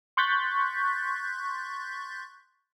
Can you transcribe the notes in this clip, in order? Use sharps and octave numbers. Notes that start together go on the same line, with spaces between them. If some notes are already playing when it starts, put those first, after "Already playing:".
C6 C#6 F#6 G6 A6 B6